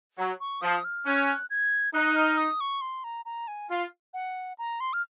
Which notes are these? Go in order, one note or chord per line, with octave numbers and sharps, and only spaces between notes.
F#3
C#6
F3 D#6
F6
C#4 F#6
G#6
D#4 F#6
F6
D#6
C#6
C6
A#5
A#5
G#5
F4
F#5
A#5
C6
F6